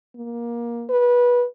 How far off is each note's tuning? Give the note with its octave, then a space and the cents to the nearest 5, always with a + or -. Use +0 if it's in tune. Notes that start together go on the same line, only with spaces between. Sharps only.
A#3 +20
B4 -20